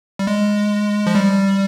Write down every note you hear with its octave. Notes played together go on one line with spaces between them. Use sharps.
G3
G#3
F3
G3